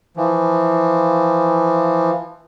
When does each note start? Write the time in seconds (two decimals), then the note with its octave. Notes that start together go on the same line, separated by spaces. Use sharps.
0.17 E3 F3